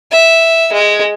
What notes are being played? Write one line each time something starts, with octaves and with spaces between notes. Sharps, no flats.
E5
G#3